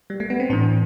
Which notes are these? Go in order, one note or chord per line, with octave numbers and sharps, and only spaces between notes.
G3
A3
B3
C4
A2 E3 D4